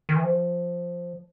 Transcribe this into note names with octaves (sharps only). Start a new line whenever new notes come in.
D#3
E3
F3